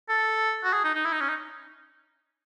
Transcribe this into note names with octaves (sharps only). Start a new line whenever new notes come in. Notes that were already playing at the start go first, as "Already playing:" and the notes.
A4
F#4
G#4
D#4
D#4
E4
D#4
C#4
D#4